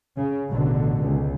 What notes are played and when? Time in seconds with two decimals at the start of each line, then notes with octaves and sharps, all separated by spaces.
0.16 C#3
0.48 A1 B2 D3
1.00 C#2